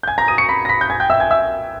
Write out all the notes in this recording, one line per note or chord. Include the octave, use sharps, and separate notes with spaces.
G6
G#5 G#6
A#5 A#6
D#6 D#7
C#6 C#7
B5 B6
A#6
B5 B6
G6
G#5 G#6
G5 G6
E5 E6
G#5 G#6
E5 E6